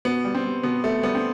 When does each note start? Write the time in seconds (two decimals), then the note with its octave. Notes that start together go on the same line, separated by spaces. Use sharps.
0.05 B2 B3
0.24 G3
0.35 C4
0.45 G3
0.63 B2 B3
0.83 B2 A3
1.03 G3 B3
1.15 C4